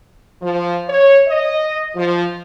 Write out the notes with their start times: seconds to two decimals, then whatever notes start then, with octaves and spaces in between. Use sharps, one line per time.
0.42 F3
0.89 C#5
1.27 D#5
1.96 F3